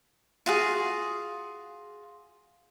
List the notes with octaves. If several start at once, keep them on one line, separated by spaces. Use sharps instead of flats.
F4 F#4 G#4